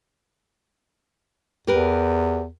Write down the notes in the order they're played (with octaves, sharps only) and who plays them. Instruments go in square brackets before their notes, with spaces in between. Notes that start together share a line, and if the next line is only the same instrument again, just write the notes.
[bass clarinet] E2 [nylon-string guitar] G4 A#4 B4